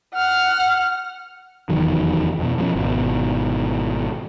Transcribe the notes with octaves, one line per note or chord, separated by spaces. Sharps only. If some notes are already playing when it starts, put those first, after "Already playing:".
F#5 F6
F1 E2 D#3 F#3
F2 B2
F3 F#3 C#4
G#1 B2